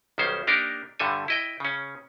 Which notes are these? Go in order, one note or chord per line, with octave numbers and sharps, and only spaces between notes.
B1 D#3 G3 C#4 C5
A#3 D4 D#4 G4 A#4
G2 D3 G3 A4 G#5
E4 D#5 G5
C#3 C#4